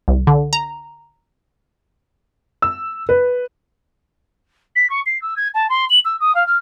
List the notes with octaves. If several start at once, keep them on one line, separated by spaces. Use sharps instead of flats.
C2
D3
A#5
E6
B4
B6
C#6
C7
E6
G#6
A5
C6
F#7
E6
D#6
F5
F6